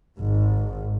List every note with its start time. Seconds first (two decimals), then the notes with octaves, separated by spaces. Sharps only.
0.19 G#1 G#2